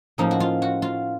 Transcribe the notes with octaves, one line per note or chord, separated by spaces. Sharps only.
A2 F3 A#3 C#4 D#4
F#4
F4
F#4
F4